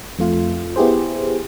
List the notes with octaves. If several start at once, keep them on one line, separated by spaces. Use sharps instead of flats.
F2 A3 F4
B3 E4 G4 G#4 C5